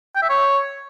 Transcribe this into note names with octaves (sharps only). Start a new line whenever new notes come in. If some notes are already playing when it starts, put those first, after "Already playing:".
G5
E5
C#5